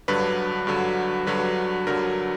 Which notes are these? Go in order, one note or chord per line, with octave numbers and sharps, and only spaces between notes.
G2 D3 F#3 B4
G2 D3 F#3
G2 D3 F#3 B4
G2 D3 F#3 A#4